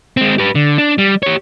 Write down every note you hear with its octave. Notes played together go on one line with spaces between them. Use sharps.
G#3 C4
G4 B4
D3
D4
G3
G4 C#5